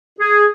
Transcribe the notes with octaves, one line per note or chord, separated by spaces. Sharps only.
G#4